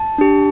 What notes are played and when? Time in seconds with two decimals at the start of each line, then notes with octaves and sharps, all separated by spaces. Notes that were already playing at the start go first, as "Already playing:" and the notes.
Already playing: A5
0.18 D4 G4